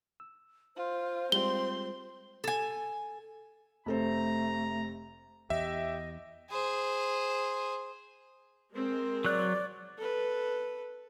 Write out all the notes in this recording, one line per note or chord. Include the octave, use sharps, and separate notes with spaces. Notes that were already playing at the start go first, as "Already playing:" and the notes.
E6
F4 C5
G3 G#3 C4 F4 C6 G7
A4 G#5
F1 A3 A4 C5 A#5
E2 G4 D#5 E5
G#4 C5
G#3 C4 A#4
F#3 D5 F#6
A4 B4